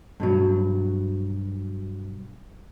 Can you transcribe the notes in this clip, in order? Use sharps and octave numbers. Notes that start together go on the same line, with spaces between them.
G2 B2 F#3